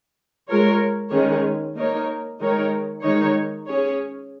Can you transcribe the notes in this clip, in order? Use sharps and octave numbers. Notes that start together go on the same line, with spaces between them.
G#3 F4 A#4 C#5
D#3 G#3 C#4 G#4 C#5
A#3 D#4 A#4 C#5
D#3 G#3 D#4 A#4 C#5
D#3 G#3 D#4 C#5
C#4 G#4 C#5